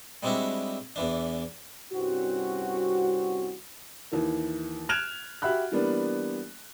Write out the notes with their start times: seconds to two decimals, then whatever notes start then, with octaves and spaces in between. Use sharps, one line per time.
0.23 G3 G#3 C4 D4 E4 F#4
0.96 E2 E3 D4
1.93 C2 G2 C4 C#4 F#4
4.12 D#2 E3 A#3
4.89 F6 F#6 G#6 D7 E7 F7
5.42 F#4 G4 E5 F#5 B5 F#6
5.72 E3 G3 A#3 B3 D4